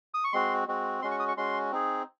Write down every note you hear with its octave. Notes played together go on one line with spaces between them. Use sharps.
D#6
C#6
G#3 C4 F#4 C6
G#3 C4 F#4
G#3 C#4 F#4 C6
C#6
D#6
C#6
G#3 C#4 F#4 C6
C4 D#4 G#4